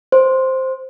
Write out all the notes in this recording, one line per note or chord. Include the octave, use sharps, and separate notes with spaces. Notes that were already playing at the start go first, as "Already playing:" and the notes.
C5